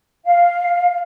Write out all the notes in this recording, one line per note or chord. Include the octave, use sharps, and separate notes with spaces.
F5